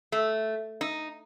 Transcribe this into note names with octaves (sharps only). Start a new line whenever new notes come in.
A3
D#4